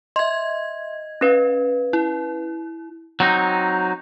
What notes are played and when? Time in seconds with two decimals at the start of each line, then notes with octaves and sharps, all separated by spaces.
0.16 D#5 E5 C6 G#6
1.21 C#4 B4 F5
1.93 E4
3.20 F#3 C4 D#4